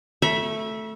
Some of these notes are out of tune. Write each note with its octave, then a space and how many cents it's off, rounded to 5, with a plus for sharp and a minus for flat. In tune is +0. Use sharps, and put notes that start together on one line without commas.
A3 +0 E5 +0 B5 -45